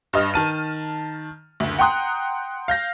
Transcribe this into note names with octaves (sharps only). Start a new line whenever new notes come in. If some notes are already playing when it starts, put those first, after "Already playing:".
G2 D#5 F6
D#3 A5 D#7
F#1 D2
F#5 G5 A#5 C6 D#6 F#6
F5 G6 A#6